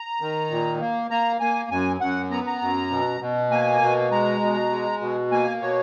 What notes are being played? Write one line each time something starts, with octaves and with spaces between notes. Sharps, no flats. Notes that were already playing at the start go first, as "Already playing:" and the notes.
Already playing: A#5
D#3
A#2
A#3
A#3 A#5
A#3 G#5
F#2 G#5
F#2 F#5
B3 A#5
A#5
F#2
B2
B2
A#3 G#5
B2
G#3 A#5
B2
G#3
B2
A#3 G#5
B2 C#5